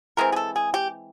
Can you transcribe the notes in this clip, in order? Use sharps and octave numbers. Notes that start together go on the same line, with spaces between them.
E3 G#3 C4 A#4
G#4
A4
G#4
G4